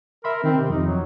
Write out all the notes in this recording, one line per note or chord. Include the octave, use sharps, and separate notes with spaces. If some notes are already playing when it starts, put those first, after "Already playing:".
A#4 E5 B5 C6
D#3 C4
C3
F2 D#4
F#3